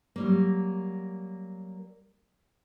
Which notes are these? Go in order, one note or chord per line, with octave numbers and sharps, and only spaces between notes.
F#3 G3 A#3